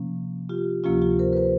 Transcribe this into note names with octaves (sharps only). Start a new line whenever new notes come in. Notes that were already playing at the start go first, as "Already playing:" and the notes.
Already playing: C3 F3 A#3 C#4
F4 G4
D2 C3 F3 A#3 C#4 F4 G4
F4 G4
A#4 C5
B4
A#4 C5